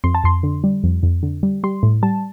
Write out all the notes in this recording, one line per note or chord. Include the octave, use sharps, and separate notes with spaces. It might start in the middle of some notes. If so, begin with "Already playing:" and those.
F2 C6
A5
F2 C6
D3
G3
F2
F2
D3
G3
G3 C6
A2
G3 A5